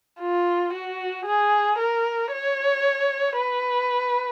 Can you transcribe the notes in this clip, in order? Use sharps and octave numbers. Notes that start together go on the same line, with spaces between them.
F4
F#4
G#4
A#4
C#5
B4